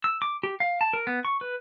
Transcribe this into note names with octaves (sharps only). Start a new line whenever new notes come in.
E6
D6
G4
F5
A5
A#4
B3
C#6
B4